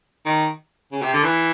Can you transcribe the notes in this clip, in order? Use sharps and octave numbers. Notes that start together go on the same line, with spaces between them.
D#3
C#3
C3
D3
E3